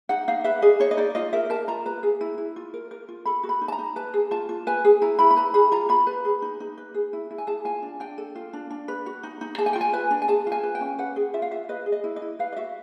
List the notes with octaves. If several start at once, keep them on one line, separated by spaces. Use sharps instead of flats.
D#4 F#5
D#4 F5
B4 E5
G#4 D#5
D#4 C#5
D#5
D#4 D5
F4 D#5
A#4 E5
A#4 A5
F4 A#5
B4 A#5
G#4
E4
E4
F4
A#4
A#4
F4
A4 B5
F#4
B5
D#4
A5
A#5
D#4
B4 A5
G#4
F4 A5
F4
B4 G#5
G#4
E4 A#5
E4 B5
B5
B4 A#5
G#4 B5
F4 A#5
F4 B5
B4
G#4
D#4
D#4
B4
G#4
E4
E4
G#5
G#4 A5
F4 G#5
D4
D4 G5
A4
F4
D4
D4
B4
F#4
D#4
D#4
G#4 A5
G#5
G5
F4
G#5
B4 G#5
D4
G#5
G#4 A5
F4
G#5
B4
G5
C#4
B4 F#5
G#4
F4 E5
F5
F4 E5
B4 D#5
G#4
D#5
E4
D#5
E4
B4 F5
D#5
F#4 E5